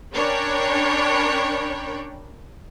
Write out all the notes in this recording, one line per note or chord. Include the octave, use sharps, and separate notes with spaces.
C#4 D4 A#4 C#5 G5 B5